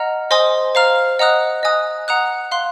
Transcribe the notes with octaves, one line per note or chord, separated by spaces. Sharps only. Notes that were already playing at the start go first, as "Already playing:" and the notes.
Already playing: D#5 F#5 A#5 F6
C5 D#5 G#5 C6 D#6
C5 F5 A#5 F6
D#5 F#5 A#5 D#6 F#6
D#5 G#5 D#6 F#6
F#5 A#5 D#6 F#6
F5 C6 F#6